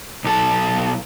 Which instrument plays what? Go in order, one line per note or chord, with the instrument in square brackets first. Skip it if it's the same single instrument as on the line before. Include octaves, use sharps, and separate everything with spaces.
[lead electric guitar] B1 A4